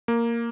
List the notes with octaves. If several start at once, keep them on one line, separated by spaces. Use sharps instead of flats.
A#3